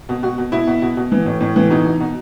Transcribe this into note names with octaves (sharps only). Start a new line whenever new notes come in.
B2
B2 F#4
B2
B2 E4
B2
B2
B2
E3
A2
A2
E3
B2 D#4
B2
B2